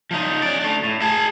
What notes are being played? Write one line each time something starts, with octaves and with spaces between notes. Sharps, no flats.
F3 D#4
C#4 D5
A3 D4
A2
G#4 A5